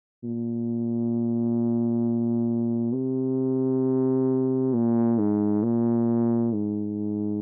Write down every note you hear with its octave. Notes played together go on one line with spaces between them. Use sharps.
A#2
C3
A#2
G#2
A#2
G#2